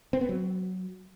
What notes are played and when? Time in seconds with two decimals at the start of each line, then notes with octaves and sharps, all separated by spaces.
0.13 C4
0.21 B3
0.29 F#3